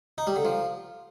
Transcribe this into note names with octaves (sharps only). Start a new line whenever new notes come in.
D#4
G3
D3
F3